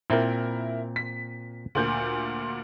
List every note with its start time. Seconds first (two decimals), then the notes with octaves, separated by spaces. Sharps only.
0.10 A#2 C4 E4 A#4
0.96 B6
1.75 D2 A#2 G6